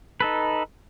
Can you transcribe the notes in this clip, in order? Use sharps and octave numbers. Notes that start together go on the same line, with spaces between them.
D#4 A4 B4